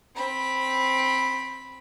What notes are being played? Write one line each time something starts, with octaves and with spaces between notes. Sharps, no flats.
C4 B5